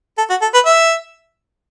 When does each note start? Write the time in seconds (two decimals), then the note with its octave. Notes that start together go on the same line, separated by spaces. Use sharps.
0.18 A4
0.30 F#4
0.42 A4
0.54 B4
0.66 E5